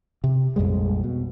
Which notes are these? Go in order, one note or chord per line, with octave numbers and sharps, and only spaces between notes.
C3
A#1 F2 G3 G#3
B2